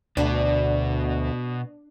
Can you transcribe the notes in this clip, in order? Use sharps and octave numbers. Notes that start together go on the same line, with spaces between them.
D2 B2 B3 D4